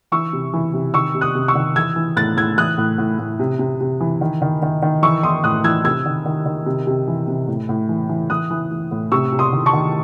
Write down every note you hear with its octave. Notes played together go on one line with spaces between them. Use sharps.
E3 C#6 E6
C3
E3
C3
D#3 C#6 E6
C3
D#6 F#6
C3
C#6 E6
D#3
E3 E6 G#6
E3
A2 F#6 A6
A2 E6 G#6
E3 D#6 F#6
A2
A2
A2
C3
C3
C3
E3
D#3
D#3
D#3
D#3
E3 C#6 E6
E3 C6 D#6
A2 D#6 F#6
E3 E6 G#6
C3 E6 G#6
D#3
D#3
D#3
C3
C3
E3
C3
A2
A2
E3
E3
E3 D#6 F#6
E3
E3
A2
C3 C#6 E6
C3
C6 D#6
D#3
A5 C#6
D#3